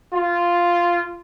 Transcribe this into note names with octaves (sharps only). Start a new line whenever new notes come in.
F4